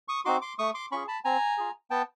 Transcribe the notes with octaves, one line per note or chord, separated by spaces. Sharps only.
C#6 D#6
C4 D#4 F#4 C6 D6
C6 D6
A3 C#6 D#6
C6 D6
C#4 F4 G#4 B5 C#6
A5 B5
C4 G#5 A#5
F4 G#4
B3 G5 A5